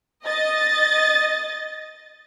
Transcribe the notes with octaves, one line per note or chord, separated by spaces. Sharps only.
D#5 A6